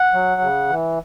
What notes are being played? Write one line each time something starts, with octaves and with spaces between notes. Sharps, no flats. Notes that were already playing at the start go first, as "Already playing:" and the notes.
Already playing: F#5
F#3
C#3
E3